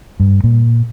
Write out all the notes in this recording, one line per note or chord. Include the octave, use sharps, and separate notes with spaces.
G2
A#2